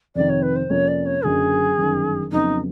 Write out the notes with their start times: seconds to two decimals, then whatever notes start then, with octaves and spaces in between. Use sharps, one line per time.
0.15 F2 C3 D#3 D5
0.30 C#5
0.43 B4
0.56 C5
0.70 F2 C3 F3 A#3 C#4 C#5
0.88 D5
1.06 C#5
1.24 F#1 F#2 D3 F#3 G#4
1.77 G1 F#2 D#3
2.32 F2 C#3 F#3 B3 D#4